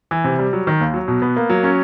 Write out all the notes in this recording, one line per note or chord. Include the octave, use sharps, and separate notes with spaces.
E3
C3
G3
F#3
D#3
D#2
F#3
B2
B3
A#3
F#3
C#4